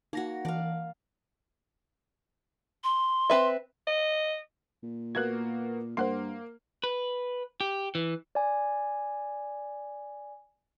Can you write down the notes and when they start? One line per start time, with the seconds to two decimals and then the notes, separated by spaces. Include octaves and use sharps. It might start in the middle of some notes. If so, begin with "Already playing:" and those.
0.13 A#3 D#4 F#4 A#6
0.45 E3 D5 F5
2.84 C6
3.30 C4 B4 E5
3.87 D#5
4.83 A#2
5.15 A#3 B3 F#4 F#6 G#6
5.97 G2 A#3 C5 F#5 C6
6.84 B4
7.61 G4
7.95 E3
8.35 D5 G#5